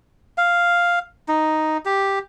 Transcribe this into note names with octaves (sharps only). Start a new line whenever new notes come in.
F5
D#4
G4